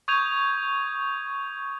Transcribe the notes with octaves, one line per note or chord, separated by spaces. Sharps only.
C#6 D#6 G6 G#6 D#7 F7